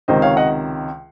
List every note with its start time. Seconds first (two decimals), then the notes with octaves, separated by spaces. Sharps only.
0.08 C#2 C3 D#3 C5 D#5
0.22 C#5 F5
0.37 D#5 F#5